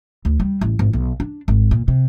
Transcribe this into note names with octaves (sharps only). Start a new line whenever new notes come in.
D2
G3
A1
G#1
B1
D4
G#1
A#2
C3